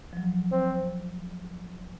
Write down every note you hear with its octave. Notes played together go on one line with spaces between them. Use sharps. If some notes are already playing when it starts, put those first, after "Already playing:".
F3
F#3
C4